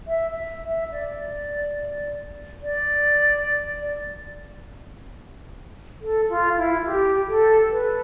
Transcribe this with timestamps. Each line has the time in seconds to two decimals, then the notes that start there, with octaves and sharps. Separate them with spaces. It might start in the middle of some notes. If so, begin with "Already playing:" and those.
0.08 E5
0.64 E5
0.92 D5
2.62 D5
6.02 A4
6.29 F4
6.58 E4
6.86 G4
7.28 A4
7.71 B4